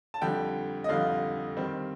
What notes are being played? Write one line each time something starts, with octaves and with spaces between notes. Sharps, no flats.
A5
F2 D3 G3 G5
D#5
F2 D3 G3 F5
D#3 G3 C4